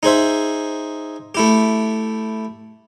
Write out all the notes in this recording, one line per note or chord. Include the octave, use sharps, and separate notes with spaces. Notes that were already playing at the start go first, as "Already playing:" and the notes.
D#4 G#4 C5 E5
A3 E4 G4